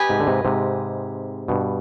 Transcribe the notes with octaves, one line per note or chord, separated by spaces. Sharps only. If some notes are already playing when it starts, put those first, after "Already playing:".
Already playing: G4 B4 D#5 G#5
G#2 C3
D3
G#2 C3
G#2 C3
G2 B2